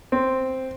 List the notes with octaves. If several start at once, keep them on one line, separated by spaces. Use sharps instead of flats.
C4